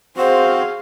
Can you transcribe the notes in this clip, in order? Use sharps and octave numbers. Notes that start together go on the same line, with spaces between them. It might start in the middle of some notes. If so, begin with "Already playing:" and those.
C4 F#4 G#4 C5 F5